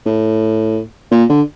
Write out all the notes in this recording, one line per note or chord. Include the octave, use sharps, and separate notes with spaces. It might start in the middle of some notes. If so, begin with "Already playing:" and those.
A2
A#2
D3